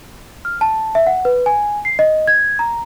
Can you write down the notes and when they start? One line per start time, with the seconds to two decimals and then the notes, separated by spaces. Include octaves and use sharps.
0.45 F6
0.61 A5
0.95 E5
1.07 F#5
1.25 B4
1.46 G#5
1.85 C7
1.99 D#5
2.28 G#6
2.59 A#5